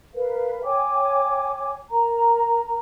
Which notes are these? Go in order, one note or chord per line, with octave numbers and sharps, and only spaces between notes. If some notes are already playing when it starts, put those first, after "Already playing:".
A#4 B4 F5
C#5 G5 G#5 D6
A#4 A#5